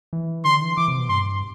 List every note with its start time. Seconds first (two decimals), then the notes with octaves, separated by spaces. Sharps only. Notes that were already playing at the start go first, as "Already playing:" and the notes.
0.13 E3
0.45 D3 C6
0.61 E3
0.77 E3 D6
0.88 C3
0.98 B2
1.09 G2 C6